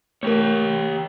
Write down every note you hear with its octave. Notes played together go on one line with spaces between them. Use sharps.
A3 G4 A#4 C#5